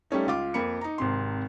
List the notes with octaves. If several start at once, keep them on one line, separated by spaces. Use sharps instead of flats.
G3 A3 C#4 D#4
C#2 F4 D6
F2 A#3 B5 C#7
D#4 A#5
G#1 C3 C6